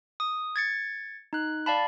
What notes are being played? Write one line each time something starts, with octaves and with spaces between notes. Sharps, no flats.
D#6
G#6 A6 C#7
D#4 F#6
D5 F5 A5 B5